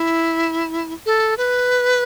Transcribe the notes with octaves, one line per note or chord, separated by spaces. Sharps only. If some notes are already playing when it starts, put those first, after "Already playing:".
Already playing: E4
A4
B4